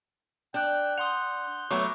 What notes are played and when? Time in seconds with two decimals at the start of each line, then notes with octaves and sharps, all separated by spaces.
0.54 D4 G5 F#6 G6
0.98 F#5 C6 D#6 G6 F7
1.71 F#3 A3 B3 G#5 A#5 C#6 D6